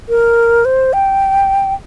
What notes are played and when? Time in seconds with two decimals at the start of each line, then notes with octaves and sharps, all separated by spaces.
0.09 A#4
0.65 C5
0.93 G5